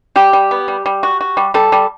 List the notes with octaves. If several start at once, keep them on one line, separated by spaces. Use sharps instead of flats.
G3 G4
G3
B3
G3
G3
F#4
F#4
G3
G3 A4
G3